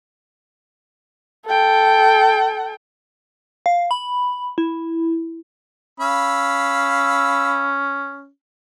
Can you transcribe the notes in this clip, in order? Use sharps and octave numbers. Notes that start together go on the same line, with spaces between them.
A4 G5
F5
B5
E4
C#4 F5 B5 E6